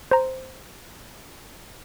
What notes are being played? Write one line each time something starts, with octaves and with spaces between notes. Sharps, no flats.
C5 A#5